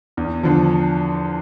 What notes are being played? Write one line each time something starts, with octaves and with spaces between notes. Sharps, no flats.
E2
D3 F3